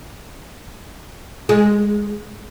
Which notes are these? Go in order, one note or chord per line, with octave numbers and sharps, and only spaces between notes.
G#3